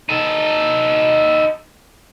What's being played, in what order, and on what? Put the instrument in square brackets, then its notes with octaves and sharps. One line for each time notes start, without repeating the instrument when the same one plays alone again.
[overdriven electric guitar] D#4 A4